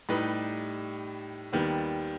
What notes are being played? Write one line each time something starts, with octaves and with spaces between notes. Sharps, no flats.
A2 G3 D#4 G4 B4
D#2 D#3 G3 B3